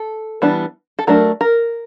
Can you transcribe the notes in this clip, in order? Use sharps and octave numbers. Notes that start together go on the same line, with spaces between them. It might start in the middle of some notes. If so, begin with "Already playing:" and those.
Already playing: A4
E3 G3 B3 D4
A4
F#3 A3 D4 A#4
A#4